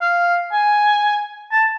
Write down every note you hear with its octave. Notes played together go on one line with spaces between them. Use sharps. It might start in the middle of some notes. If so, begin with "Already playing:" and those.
F5
G#5
A5